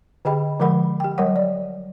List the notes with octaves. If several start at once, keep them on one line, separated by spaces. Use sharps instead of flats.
D3 G4 G#4 D#5 G5 B5
D3 F3 G#3 A#4 F#5 B5
G4 G5
F#3 G3 A#4 C#5 F#5
D5